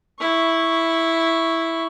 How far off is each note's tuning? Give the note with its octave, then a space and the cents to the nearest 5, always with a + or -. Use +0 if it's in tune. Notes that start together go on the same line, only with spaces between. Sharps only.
E4 +0 C#6 +0